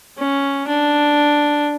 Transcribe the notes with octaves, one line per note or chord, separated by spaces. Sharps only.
C#4
D4